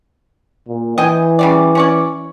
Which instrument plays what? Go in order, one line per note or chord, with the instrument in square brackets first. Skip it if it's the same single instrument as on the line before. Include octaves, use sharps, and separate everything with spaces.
[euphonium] A#2
[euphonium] E3 [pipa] D#5 G5 G#5
[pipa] C#3 G3 D5
C#4 C#5 D5